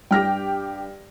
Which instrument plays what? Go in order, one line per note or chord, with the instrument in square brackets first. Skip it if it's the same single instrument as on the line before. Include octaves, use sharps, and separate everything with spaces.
[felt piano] G2 F6 A#6 [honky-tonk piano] G4 G5